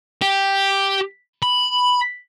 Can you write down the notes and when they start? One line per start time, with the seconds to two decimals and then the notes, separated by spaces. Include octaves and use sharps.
0.22 G4
1.43 B5